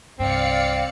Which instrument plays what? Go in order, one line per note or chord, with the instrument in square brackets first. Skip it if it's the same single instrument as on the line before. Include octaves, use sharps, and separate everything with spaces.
[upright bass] C2 G2 [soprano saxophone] C4 [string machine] D5 F5 C#7